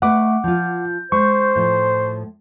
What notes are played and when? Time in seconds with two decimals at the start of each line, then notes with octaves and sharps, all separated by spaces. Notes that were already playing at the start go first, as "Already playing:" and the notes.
0.02 A3 B4 D#5 F#5 D6
0.44 F3 F4 G6
1.12 G#3 C5 C#6
1.56 A2 F3